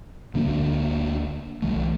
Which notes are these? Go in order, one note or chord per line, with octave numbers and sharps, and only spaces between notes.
D2 D3 A#3 D4
B1 E3 A3